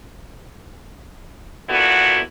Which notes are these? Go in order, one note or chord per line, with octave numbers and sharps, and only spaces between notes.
A#2 D3 B3 E4 F#4